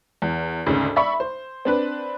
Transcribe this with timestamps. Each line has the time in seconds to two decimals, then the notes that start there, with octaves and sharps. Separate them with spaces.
0.22 E2
0.66 G#1 D2 C#3
0.96 D5 E5 B5 C#6
1.20 C5
1.65 C4 D4 B4